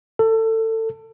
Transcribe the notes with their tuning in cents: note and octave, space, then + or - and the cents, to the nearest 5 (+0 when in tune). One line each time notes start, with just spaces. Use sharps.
A4 +25